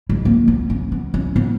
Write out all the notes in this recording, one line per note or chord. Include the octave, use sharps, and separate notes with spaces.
G#3
A#3
B3
C#4
B3
C#4
B3